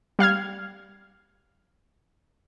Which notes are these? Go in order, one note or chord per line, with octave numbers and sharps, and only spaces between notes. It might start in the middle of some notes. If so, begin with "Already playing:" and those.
G3 F5 F6 G#6